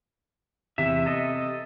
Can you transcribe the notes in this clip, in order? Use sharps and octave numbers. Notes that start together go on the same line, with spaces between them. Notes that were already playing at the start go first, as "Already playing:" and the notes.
E2 C3 E5
A4 D#5